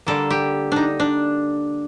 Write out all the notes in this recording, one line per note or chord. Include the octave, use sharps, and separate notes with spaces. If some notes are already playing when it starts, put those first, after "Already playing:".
D3 G3 A#3 A4
G4
D4 D#4
D4